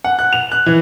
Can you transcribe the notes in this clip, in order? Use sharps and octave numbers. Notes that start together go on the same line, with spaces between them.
F#5
F#6
F7
F#6
E3